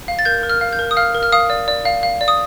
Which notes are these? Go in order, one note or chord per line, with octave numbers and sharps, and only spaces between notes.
F5
A6
A#4 G6
A#4
F6
F5
G6
A#4
D#6
F5 F6
A#4
F6
F5 D#6
D5
D5
F5
F5
D5
D#6